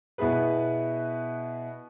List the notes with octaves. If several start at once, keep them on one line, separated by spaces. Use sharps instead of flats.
B2 B3 E4 G#4 B4